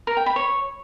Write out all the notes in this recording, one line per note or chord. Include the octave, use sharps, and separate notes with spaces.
A#4
G5
B5
C#5